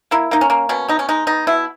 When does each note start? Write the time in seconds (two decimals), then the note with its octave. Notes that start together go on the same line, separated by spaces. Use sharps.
0.11 A#3 E4
0.31 A#3 D#4
0.41 C#4
0.50 A#3
0.69 B2 C#4
0.88 B3 D#4
0.99 C#4
1.09 G#3 D#4
1.27 B3 D#4
1.47 B2 E4